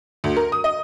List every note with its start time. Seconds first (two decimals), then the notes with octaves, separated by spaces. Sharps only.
0.24 D2
0.37 A#4
0.52 D#6
0.64 D#5